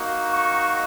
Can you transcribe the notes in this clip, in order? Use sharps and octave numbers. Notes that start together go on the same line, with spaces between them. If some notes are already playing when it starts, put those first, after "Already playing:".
Already playing: A#3 D#4 F#4
C#6